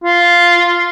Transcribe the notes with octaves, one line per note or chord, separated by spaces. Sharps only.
F4